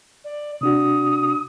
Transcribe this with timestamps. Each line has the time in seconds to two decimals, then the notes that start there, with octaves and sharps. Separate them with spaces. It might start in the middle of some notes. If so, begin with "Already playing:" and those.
0.24 D5
0.61 C3 D4 F#4 D#6